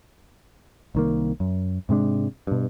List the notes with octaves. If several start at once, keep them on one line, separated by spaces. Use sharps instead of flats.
C2 D#3 A#3
F#2
G#2 C3 G#3 D4
G2 B2